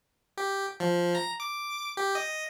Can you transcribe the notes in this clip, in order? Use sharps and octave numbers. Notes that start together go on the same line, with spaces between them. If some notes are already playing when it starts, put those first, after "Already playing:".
G4
F3
A#5
D6
G4
D#5